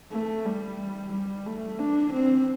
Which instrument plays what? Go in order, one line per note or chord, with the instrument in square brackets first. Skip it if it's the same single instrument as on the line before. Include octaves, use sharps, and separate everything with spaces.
[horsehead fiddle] A3
G3
G3
A3
D4
C4